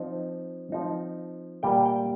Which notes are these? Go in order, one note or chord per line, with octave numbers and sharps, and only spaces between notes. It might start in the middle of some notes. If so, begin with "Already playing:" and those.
Already playing: F3 C4 D#4
F3 C4 D#4
A#2 G3 A#3 G5
G5